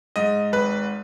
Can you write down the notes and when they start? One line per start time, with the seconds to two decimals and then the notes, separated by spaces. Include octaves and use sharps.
0.16 G#2 D#5
0.52 G#1 B4